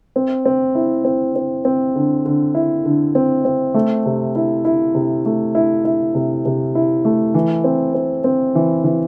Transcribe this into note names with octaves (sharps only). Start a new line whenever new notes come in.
C4
C4
E4
C4
C4
C4
D3
D3
E4
D3
C4
C4
A3
C3
E4
E4
C3
A3
E4
E4
C3
C3
E4
A3
E3
C4
C4
C4
E3
E3